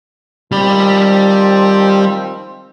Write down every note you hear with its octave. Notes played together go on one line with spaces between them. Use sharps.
D#3 F3 G3 C4 B5